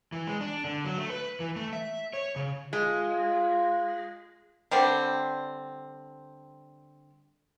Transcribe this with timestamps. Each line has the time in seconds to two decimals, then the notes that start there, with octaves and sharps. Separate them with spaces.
0.12 E3
0.27 G#3
0.41 D4
0.64 D3
0.85 F#3
0.98 A3
1.10 B4
1.40 E3
1.56 A3
1.73 E5
2.13 C#5
2.36 C#3
2.73 G#3 F4
4.71 D3 G3 C4 D5